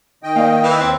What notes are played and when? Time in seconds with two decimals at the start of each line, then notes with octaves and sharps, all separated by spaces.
0.23 D#3 D#5 G5
0.36 A#3 D5 F5
0.64 E3
0.81 D#2 C4